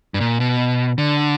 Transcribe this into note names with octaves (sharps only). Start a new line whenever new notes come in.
G2
A#2
B2
D3